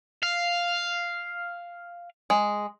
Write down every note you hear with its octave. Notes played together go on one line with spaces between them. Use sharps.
F5
G#3